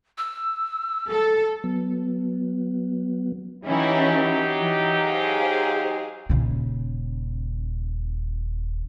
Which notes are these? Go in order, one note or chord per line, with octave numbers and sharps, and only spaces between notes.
E6
A4
F#3 B3
E3 F#3 C#4 D#4 E4 G4
E3
G#4 C5 F5
D#1 C#3